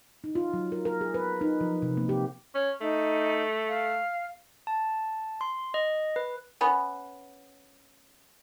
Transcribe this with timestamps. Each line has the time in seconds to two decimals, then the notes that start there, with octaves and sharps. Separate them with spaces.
0.24 D#4
0.35 F4
0.54 F#3
0.72 A#4
0.85 A#4
1.01 G#4
1.14 B4
1.41 D#4
1.61 F3
1.82 C3
1.97 A#3
2.09 G4
2.55 C#4
2.81 A3 D#4
3.69 F5
4.67 A5
5.41 C6
5.74 D#5
6.16 B4
6.61 B3 C#4